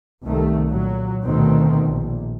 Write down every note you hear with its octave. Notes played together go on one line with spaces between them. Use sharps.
C2 C3 D#3 A3
A#2 F#3
D2 B2 D#3 A3 C4
A#1